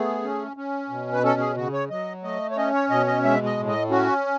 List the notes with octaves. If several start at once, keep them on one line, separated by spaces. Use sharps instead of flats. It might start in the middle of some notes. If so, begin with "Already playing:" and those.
Already playing: A3 B3 G#4
C#4
C#4
B2
B4
C#4 A4
G#4
C#3 F#4
C#5
F#3 D#5
A3 D#5
C#5
C#4 D#5
C#5
B2 D#5
D#5
G#3 E5
D#5
A2
D#5
C#4 F#4